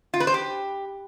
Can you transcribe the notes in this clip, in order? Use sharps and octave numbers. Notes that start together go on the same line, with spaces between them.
F4
B4
C5
G4